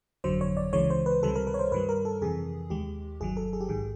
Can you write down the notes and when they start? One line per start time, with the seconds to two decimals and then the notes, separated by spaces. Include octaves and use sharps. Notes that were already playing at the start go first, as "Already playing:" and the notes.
0.24 G1 F2 D3 F#3 C5
0.41 C#5
0.57 D5
0.73 C#2 C#3 E3 G#3 C#5
0.90 C5
1.06 B4
1.22 C#2 C3 D#3 G3 A4
1.36 A#4
1.47 B4
1.54 C#5
1.59 C5
1.72 G2 D#3 G3 B4
1.89 A#4
2.05 A4
2.22 F2 C3 E3 G#4
2.70 D#2 D#3 G#3 G4
3.20 G1 G2 D#3 F#3 G#4
3.37 A4
3.53 G#4
3.60 G4
3.69 A#1 G#2 D#3 G#4